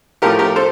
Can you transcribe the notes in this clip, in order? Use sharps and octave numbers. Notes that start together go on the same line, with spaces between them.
A2 F3 A3 G4 A#4
G4 A#4
A4 C5